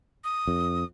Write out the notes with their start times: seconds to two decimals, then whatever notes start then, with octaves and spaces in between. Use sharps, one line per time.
0.24 D#6
0.47 F2